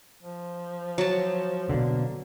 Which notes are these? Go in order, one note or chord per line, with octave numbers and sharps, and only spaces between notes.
F3
F#3 A5
B2 D3 A#3